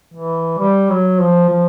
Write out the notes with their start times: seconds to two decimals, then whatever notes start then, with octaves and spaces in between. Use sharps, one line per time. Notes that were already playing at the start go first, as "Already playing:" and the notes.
0.14 E3
0.59 G3
0.89 F#3
1.20 F3
1.49 F3